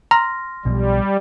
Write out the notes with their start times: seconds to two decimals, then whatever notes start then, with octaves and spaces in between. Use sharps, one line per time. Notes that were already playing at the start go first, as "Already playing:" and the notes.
0.11 A#5 C6 F6 A#6
0.65 B1 B2 F3 G3